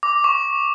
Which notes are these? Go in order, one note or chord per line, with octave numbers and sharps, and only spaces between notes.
D6
C#6